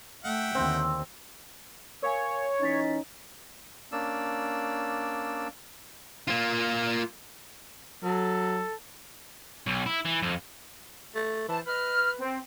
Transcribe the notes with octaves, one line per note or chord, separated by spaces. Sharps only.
A3 E5 F#5 G5
D#2 D3 C4
A#4 C#5 F5 G#5
E3 C#4 D#4 D#5 A6 B6
A#3 C#4 D4 D5 E6
A#3 F4
F#3 A4
B1
E4
E3
F2
A3
E3 C5 A5
B4 D#5 F6
C4